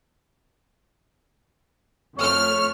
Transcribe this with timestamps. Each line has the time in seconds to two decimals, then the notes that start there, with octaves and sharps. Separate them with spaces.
2.18 F2 A3 C#5 F6